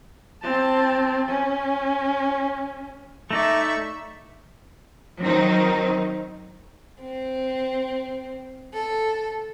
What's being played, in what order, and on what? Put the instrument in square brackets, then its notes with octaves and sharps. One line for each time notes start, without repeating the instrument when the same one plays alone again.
[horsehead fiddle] C4 A5
C#4
[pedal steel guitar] A3 D#4 D5 [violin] E5 C#6
[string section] D#3 F#3 C4 D#4
[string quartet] C4
A4